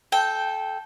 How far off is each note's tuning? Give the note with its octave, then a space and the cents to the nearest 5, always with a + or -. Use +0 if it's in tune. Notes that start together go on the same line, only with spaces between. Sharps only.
A4 -20 G5 +0